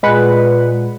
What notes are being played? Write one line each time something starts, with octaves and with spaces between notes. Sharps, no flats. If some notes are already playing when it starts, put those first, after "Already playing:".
A#2 G#3 B4 F#5